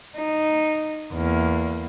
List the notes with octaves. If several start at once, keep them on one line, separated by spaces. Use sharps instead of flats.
D#4
E2 A#3